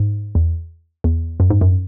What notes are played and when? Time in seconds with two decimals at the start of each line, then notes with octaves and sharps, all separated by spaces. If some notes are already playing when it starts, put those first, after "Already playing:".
Already playing: G#2
0.35 E2
1.04 E2
1.40 F#2
1.50 G#2
1.61 F#2